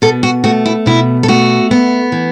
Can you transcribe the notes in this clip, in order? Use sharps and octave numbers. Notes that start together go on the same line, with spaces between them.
B2 A4
F#4
A3 F#4
E4
B2 E4
A4
A3 F#4
B3
E3